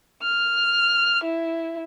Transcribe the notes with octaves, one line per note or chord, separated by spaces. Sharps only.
F6
E4